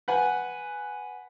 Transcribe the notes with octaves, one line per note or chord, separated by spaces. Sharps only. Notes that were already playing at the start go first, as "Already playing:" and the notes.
B4 F#5 G#5